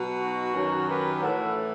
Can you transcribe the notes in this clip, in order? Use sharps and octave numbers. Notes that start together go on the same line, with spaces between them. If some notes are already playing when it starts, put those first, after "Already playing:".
Already playing: B2 F#3
D#4 F#4
F#2 D#3 F#3
G4 B4
A2 E3 F#4 A4